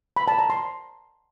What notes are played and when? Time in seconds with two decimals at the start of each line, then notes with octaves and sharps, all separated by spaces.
0.17 B5
0.28 A5
0.39 A#5
0.50 C6